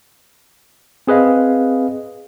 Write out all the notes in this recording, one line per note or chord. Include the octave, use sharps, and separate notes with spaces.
C4 G#4 B4 D#5 F5